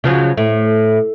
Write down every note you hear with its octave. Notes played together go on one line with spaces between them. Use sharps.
C#3 F3 F#3
A2